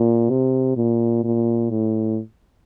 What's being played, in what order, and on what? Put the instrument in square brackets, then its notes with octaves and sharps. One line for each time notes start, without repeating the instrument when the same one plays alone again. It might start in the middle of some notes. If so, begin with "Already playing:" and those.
Already playing: [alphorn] A#2
C3
A#2
A#2
A2